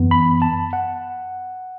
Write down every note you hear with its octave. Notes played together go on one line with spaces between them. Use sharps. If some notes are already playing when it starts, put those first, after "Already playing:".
Already playing: F#2 E3 B3
B5
A5
F#5